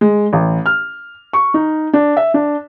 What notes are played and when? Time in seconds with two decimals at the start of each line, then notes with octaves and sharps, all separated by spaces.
0.01 G#3
0.33 A1
0.66 F6
1.33 C#6
1.54 D#4
1.93 D4
2.17 E5
2.34 D4